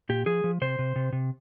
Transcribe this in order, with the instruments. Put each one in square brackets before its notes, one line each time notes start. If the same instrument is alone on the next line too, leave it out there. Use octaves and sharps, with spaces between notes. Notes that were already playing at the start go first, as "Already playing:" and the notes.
[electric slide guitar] A#2 G4
F3 G#4
F3
C3 C5
C3
C3
C3